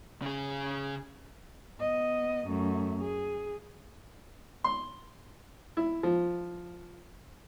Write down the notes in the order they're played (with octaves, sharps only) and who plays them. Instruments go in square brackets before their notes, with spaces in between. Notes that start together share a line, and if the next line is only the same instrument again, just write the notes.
[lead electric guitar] C#3 G#4
[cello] B3 D#5
F#2 A3
G#4
[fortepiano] C6
E4
F3